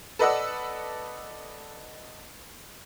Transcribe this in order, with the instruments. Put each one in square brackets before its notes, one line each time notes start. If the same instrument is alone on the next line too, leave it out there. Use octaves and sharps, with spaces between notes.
[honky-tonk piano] A4 B4 D5 D#5 F#5 E6